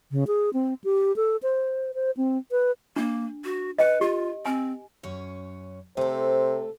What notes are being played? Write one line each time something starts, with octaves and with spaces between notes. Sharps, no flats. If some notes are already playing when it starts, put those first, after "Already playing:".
C#3
G#4
C4
G4
A4
C5
C5
C4
B4
A#3 D4
F#4
B4 D#5 G5
F4 G4
C4 G#5
F#2 C#4 C#5
C3 A3 A4 C5